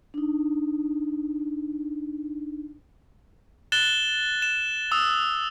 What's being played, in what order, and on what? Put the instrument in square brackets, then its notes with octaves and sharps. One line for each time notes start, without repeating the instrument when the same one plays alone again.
[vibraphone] D4 D#4
[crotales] F#6 A6 E7 G7
E7
D#6 E6